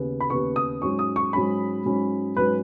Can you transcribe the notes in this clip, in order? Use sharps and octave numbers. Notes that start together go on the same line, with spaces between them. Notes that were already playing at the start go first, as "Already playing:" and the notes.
Already playing: D#2 C#3 B3
B5
D#2 C#3 B3 C#6
D#6
G#2 F#3 C#4 C#6
D#6
C#6
G#2 F#3 C#4 B5
G#2 F#3 C#4
G#2 F#3 C#4 B4